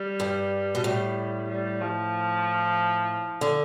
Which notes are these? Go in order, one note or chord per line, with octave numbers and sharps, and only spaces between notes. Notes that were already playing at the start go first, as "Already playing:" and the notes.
Already playing: G3
G2
B2
A2
G3
F3
D3